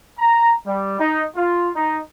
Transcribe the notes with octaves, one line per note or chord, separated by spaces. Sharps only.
A#5
G3
D#4
F4
D#4